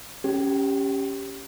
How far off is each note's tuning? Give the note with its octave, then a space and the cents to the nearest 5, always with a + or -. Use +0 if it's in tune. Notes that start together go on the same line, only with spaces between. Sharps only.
C#4 +0 G4 +0